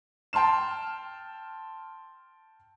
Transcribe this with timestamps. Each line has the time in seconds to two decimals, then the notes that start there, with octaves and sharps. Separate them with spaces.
0.33 G5 A5 C6 F6 E7